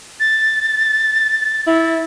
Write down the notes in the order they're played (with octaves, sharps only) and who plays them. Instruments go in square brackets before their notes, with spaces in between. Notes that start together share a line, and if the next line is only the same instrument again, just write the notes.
[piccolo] A6
[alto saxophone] E4